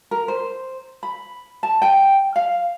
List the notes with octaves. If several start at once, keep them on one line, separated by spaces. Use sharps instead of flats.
A#4
C5
B5
A5
G5
F5